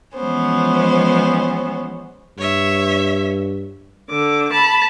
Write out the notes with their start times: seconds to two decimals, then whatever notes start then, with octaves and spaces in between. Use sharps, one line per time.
0.16 E3 F3 G#3 B3 C#4 C5
2.38 G2 C#5 E5
4.10 D3 D6
4.52 A5 B5